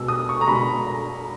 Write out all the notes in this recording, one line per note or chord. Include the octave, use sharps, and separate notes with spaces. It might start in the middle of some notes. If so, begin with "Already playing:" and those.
Already playing: B2 G#3 E6
D#6
C#6
A#5
B2 G#3 B5
A#5